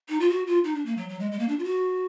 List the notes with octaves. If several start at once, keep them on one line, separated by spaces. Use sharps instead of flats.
D#4
F4
F#4
F4
D#4
D4
A#3
F#3
F#3
G#3
G#3
A#3
D4
F4
F#4